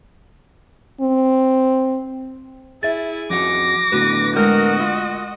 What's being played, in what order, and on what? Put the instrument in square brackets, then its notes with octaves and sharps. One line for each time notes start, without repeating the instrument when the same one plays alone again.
[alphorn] C4
[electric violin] E4 [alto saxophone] G#4 [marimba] E5 A6
[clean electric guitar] F2 F#4 [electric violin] D6 A#6
[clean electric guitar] A2 D3 B3 [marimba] F#4 [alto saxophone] B4
[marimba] G#3 [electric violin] F#4 D#5 [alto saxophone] A#4
[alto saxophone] F4